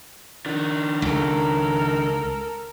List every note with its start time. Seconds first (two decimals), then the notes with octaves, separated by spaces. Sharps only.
0.46 D#3 D4
1.02 C#2 A4 A#4